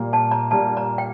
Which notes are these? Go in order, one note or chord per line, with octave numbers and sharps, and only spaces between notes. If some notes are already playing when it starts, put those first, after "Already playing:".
Already playing: A#2 G3 A#3
A5
A#5
A#2 G3 A#3 A5
A#5
G5